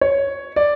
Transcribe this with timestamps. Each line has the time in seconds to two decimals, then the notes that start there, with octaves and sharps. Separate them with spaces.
0.01 C#5
0.56 D5